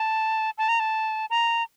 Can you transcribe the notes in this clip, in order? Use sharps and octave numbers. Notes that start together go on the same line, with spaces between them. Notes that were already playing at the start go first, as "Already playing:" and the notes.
Already playing: A5
A5
A#5
A5
A#5